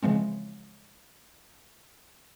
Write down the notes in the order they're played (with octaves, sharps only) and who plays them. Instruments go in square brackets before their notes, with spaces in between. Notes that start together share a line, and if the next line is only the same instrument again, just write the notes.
[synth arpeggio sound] C#3 E3 F3 G#3 C4